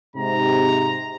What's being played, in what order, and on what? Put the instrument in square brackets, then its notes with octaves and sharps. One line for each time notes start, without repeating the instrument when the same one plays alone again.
[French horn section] G#2 C3 [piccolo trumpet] A#5